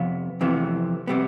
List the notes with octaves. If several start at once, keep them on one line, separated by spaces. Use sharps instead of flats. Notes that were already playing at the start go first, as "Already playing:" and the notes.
Already playing: F2 C3 B3 F5
F2 C3 E3 B3
C3 G3 B3